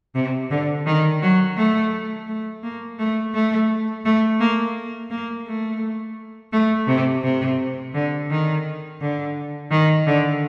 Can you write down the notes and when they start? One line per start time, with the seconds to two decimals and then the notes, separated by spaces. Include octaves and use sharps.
0.15 C3
0.51 D3
0.86 D#3
1.22 F#3
1.57 A3
2.28 A3
2.63 A#3
2.99 A3
3.34 A3
4.05 A3
4.40 A#3
5.11 A#3
5.47 A3
6.53 A3
6.88 C3
7.24 C3
7.94 D3
8.30 D#3
9.01 D3
9.71 D#3
10.07 D3